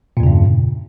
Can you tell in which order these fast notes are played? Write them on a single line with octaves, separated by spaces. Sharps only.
A#2 E2 C#3 G2